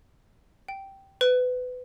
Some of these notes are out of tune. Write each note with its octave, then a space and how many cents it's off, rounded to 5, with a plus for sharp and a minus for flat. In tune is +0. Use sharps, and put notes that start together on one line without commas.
G5 -10
B4 +25